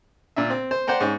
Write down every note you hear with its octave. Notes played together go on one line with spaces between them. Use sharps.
A#2 D4 E5
C4
C5
C5 D5 F#5 G5 A#5
G#2 C#4